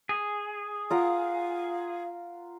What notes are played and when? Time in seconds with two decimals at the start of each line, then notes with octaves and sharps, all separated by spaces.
0.09 G#4
0.90 F4 A#4 F5 F#5